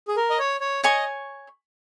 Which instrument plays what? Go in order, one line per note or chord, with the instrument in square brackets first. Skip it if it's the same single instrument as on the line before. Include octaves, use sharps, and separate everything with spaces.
[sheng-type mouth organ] G#4
A#4
D#5
C#5
C#5
[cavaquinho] C#5 G#5 C#6 [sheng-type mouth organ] D#5